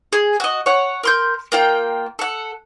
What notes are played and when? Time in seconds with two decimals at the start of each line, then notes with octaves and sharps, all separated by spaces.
0.13 G#4
0.40 F#4 D#5
0.66 C#5 F#5
1.03 A#4 C6 G6
1.52 A#3 F4 G5
2.19 A4 F#5